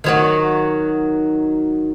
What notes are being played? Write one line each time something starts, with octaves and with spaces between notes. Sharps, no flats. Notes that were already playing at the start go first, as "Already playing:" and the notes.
D#3 F#3 F#4